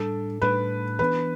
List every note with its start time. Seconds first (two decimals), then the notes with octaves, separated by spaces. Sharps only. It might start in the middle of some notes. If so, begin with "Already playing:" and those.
Already playing: A2 G3 D4 A4
0.42 A2 G3 D4 B4
0.99 E3 B3 D4 B4